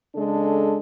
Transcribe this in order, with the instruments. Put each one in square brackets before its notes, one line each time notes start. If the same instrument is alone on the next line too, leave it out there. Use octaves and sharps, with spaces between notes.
[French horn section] C#3 G#3 D4 A4